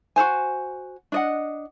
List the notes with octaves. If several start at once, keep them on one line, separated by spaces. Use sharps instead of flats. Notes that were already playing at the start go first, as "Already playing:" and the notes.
F#4 G#4 C5 G#5
D4 D#5 F#5